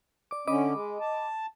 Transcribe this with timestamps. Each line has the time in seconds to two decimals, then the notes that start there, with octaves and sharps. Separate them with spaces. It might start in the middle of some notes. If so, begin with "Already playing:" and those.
0.31 D5 D6
0.48 D3 C#4 D#5 B5 D6
0.74 G#3
1.00 A5